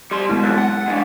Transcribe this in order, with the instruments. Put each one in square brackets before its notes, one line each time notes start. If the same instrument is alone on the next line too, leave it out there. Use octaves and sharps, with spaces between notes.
[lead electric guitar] G3 C6
[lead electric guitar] B2 [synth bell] G#3 E4
[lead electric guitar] F#2 E3 [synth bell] F#6 A6
[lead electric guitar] F#5
G#3 D4